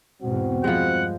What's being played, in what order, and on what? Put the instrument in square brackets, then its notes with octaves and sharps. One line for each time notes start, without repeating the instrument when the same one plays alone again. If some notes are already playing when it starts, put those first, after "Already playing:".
[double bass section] E2 G#2 B2 [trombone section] C4 F#4
[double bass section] G2 [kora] F3 G3 G#3 [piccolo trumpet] F#5